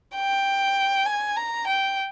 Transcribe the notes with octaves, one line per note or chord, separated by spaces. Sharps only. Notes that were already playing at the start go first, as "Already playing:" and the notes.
G5
G#5
A#5
G5